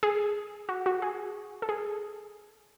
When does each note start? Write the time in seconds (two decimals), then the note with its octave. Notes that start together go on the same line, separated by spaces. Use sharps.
0.03 G#4
0.69 F#4
0.86 F#4
1.02 G#4
1.62 A4
1.69 G#4